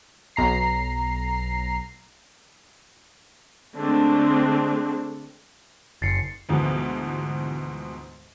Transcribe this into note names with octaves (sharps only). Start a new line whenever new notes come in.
B1 A#5 C7
D3 G#3 A3 C4 D4
F#1 A6 C7 C#7
D2 G#2 B2 E3 F3 B3